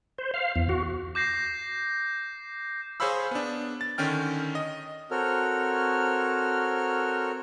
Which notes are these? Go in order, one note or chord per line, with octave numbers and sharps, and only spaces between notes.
C5
F5
E2
F#4
D6 G6 A#6 C7
G#4 C5 C#5 F5 B5 E6
B3 D4
A6
D3 D#3 C#4 G5 F6
D#5
C4 F#4 A4 A#4 C#5 F6